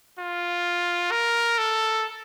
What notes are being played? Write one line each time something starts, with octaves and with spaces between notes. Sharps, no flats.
F4
A#4
A4